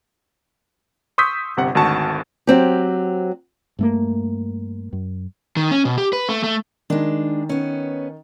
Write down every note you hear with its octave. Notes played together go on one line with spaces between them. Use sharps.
C6 C#6 D#6 E6 G6 B6
G1 C3 F#5
G#1 D2 F#4 A5 C#6
F#3 C4 G4
G2 A3 A#3
F#2
D#3
C#4
B2
G4
B4
A3
A3
D#3 G#3 D4
B3 C#4